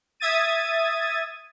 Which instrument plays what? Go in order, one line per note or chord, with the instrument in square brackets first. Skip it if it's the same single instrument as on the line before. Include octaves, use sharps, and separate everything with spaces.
[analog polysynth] E5 D#6 G#6 A6 D#7